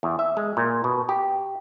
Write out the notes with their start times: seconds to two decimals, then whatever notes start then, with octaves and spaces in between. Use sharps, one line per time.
0.03 E2
0.19 E5
0.37 G#3
0.57 A#2
0.84 B2
1.09 G4